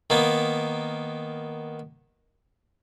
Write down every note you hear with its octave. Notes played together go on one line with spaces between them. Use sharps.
D#3 A#3 B3